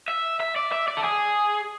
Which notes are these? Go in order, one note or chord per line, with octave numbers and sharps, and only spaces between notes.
E5
E5
D5
E5
D5
A4
G#4